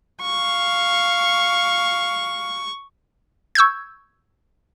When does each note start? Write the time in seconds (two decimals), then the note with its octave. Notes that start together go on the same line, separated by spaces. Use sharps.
0.22 F5 C#6
3.55 C#6 E6 G6 G#6